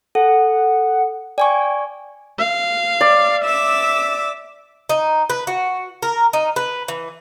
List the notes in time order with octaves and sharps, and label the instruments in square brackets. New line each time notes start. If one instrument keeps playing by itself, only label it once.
[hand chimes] A4 [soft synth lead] F#5
[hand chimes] D5 G#5 C#6 [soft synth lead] G5
[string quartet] F5
[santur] D5
[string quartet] E5 D6 E6
[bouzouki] D#4
B4
F#4
A#4
D#4
B4
E3